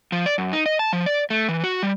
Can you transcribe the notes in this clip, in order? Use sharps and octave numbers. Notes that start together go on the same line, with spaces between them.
F3
D5
F#2
D#4
D#5
A5
F3
D5
A3
E3
F#4
G3